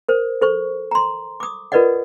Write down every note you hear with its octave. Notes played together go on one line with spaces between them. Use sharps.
A#4 C5
A4 C5 C#6
A#5 C6
D6 D#6
F4 A#4 B4 D5 D#5 F#5